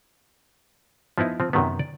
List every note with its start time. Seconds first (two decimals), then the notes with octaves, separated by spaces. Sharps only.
1.18 F3 B3 D#4 E4
1.40 F3 C4
1.53 F#2 C3 D#3 F#3 B3
1.79 D5